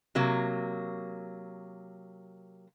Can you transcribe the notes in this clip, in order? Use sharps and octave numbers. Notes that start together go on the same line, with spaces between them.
C3 F#3 A#3